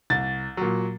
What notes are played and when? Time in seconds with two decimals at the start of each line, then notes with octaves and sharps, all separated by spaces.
0.10 C2 A6
0.57 A#2 F#3